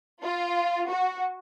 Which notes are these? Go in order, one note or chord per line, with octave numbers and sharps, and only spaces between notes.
F4
F#4